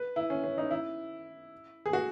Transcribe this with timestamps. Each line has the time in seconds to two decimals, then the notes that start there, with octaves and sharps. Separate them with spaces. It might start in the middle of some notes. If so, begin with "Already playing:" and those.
Already playing: B4
0.16 E4
0.30 C#4
0.43 C#4
0.58 D#4
0.71 E4
1.86 G#4
1.93 F#4